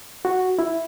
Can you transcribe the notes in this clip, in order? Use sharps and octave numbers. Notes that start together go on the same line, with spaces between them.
F#4
E4